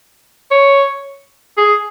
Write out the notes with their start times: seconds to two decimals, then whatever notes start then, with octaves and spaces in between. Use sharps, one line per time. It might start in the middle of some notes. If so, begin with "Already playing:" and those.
0.51 C#5
1.58 G#4